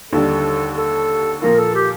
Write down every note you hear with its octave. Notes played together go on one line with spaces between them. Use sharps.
D#2 D3 G3 A4
A4
A#2 F3 A#3 F4 A#4
A4
G4